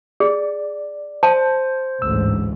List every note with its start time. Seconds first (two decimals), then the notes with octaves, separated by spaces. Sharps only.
0.20 G#4 D5
1.23 C5 A5
2.02 A1 D2 G#2 E6